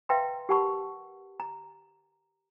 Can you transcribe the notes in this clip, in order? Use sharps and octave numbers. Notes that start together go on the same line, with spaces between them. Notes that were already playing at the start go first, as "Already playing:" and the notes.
B4 E5 F5 G5 A#5 C6
G4 A#4 F#5 A5 B5 C#6
A#5